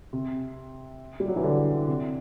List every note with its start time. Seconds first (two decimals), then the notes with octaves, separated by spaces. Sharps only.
0.13 C3
1.20 G3
1.28 F#3
1.36 E3
1.43 D3
1.88 C3